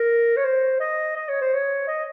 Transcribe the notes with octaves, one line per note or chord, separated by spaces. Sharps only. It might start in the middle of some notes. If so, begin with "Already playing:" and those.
Already playing: A#4
C#5
C5
D#5
D#5
C#5
C5
C#5
D#5